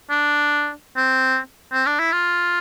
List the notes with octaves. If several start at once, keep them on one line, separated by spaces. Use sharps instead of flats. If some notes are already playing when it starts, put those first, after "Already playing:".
D4
C4
C4
D4
E4
F4